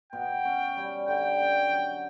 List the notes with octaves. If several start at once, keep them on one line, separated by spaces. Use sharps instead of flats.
B2 G5
C#4
G3
D3 G5
C#4
F#3